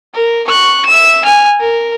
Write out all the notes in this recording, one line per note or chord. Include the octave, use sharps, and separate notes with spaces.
A#4
C#6 F#6
E5 E7
G#5 F6
A#4